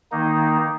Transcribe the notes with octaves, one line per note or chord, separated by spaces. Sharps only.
D#3 A#3 D#4